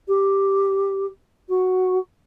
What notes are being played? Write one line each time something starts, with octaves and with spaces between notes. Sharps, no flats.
G4
F#4